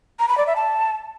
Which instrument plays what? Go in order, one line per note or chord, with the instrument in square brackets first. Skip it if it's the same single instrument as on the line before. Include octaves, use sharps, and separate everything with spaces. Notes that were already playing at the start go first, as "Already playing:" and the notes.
[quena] A#5
B5
D5
E5
A5